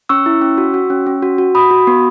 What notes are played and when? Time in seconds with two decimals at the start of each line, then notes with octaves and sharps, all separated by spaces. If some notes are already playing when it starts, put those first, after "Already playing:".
0.09 C#4 C#6 E6
0.26 E4
0.42 C#4
0.58 F#4
0.74 F#4
0.90 C#4
1.07 C#4
1.23 F#4
1.38 F#4
1.55 F#4 B5 D#6
1.71 F#4
1.87 B3